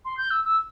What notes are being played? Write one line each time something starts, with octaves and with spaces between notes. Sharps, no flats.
C6
G6
E6
E6